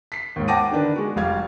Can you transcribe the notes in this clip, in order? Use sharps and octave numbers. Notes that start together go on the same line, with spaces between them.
B6 C7
D#2 G#2
F#5 G5 A5 D6 A#6 D#7
D3 D#3 D4 B4
G#3 F#4
F1 G3 F5 G#6